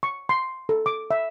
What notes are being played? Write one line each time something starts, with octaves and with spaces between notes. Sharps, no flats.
C#6
C6
A4
D6
E5